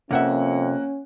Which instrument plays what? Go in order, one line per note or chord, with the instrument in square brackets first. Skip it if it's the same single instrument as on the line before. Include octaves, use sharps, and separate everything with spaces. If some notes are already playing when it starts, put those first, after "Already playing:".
[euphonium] F2 [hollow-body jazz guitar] C3 E5 [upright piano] A#3 F#5 [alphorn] C#4